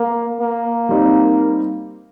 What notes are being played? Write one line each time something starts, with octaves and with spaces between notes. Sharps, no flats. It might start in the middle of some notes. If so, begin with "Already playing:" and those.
Already playing: A#3
A#3
G3 C4 D#4